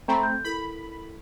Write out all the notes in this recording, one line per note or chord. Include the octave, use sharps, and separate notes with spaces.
A3 C4 A#5 B5
G6
E4 A4 A#4 B5